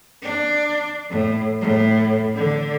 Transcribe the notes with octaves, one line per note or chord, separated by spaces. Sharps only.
D4
A2
A2
D3